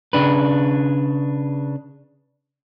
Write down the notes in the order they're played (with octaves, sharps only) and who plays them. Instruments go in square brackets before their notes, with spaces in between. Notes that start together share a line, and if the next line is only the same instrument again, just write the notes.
[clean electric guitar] C#3 D4 B4